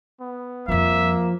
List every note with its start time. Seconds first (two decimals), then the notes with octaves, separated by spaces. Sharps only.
0.20 B3
0.68 F2 F3 G3 A#3 E5